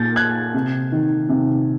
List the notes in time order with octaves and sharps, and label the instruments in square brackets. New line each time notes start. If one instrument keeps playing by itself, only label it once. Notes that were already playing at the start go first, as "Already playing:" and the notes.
Already playing: [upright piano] A#2 G6 A6
F#6 G#6
C3
D#3
C3